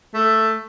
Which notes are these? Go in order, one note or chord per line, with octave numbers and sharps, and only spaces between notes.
A3